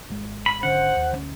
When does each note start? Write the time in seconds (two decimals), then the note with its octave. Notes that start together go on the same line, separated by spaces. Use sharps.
0.10 G#1 G#3
0.46 B5
0.63 G#1 D3 C#4 C5 F#5
0.97 D#2
1.11 D2 D3 C#4